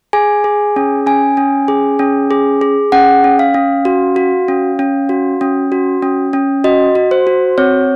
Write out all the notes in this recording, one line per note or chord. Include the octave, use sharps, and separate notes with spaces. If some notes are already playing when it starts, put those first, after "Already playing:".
G#4 G#5
G#4
C#4
C#4 G#5
C#4
G#4
C#4
G#4
G#4
C#4 F#5
C#4
F5
C#4
F#4
F#4
C#4
C#4
F#4
C#4
F#4
C#4
C#4
F#4 D#5
F#4
C5
F#4
C4 C#5